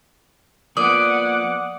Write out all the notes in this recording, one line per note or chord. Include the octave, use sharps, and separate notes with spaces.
F3 A#3 B3 D5 F#5 D6 D#6